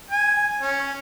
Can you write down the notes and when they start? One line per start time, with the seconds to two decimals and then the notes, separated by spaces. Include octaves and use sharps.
0.11 G#5
0.61 C#4